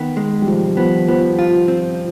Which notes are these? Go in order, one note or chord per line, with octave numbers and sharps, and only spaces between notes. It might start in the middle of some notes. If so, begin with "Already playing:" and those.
Already playing: D#3 B3
G#3
G3
B1 F3
F3 B3
F3 B3
F4
C4